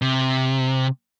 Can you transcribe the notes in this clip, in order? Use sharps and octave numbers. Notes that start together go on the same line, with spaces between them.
C3